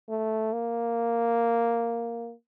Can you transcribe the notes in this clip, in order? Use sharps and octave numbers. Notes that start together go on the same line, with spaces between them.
A3
A#3